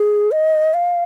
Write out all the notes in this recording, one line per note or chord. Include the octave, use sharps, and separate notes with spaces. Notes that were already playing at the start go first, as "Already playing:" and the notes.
Already playing: G#4
D#5
F5